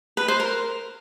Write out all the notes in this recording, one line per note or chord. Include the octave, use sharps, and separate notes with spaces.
B4
C5
A#4